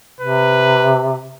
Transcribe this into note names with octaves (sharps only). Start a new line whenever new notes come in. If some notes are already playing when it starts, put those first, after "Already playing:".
C3 B4